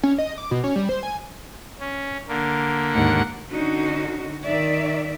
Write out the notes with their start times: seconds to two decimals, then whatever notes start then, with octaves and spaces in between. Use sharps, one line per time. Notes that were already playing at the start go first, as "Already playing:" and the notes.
0.03 C#4
0.18 D#5
0.38 D6
0.51 B2
0.64 C#4
0.76 G3
0.89 C5
1.03 G#5
1.80 C#4
2.28 D3 A#3
2.93 D#2 G#2 F#5
3.51 D3 C#4 D#4 F#4
4.45 D#3 D5 E5